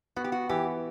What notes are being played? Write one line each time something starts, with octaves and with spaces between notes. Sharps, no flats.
B3 F#4
G4
F#4
E3 G4